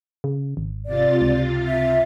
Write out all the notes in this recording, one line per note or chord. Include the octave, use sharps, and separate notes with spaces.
C#3
G#1
C3 F4 D5 A6
C#2
E5